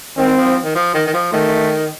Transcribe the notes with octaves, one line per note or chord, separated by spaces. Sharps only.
D#3 C4
F3
D#3
F3
D#3
D#3
F3
D#3 A3